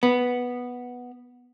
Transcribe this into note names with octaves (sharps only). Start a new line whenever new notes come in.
B3